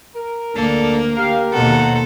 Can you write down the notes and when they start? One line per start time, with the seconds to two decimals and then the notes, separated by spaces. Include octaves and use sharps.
0.15 A#4
0.56 D2 A#3 D4 A4
1.16 G4 A#4 F5
1.53 D#2 B2 A4 C5 F#5 A#5